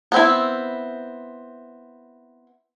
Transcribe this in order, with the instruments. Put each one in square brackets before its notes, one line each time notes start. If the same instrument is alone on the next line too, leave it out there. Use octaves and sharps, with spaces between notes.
[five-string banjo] B3 C4 E4